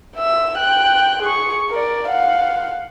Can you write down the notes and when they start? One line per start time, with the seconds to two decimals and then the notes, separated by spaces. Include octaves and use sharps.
0.16 E5 E6
0.58 G5 F#6
1.23 G#4 C#6
1.70 A#4 D5
2.08 F5 F#5